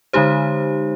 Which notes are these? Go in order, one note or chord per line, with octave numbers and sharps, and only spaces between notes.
D3 G#3 D#4 G4 C5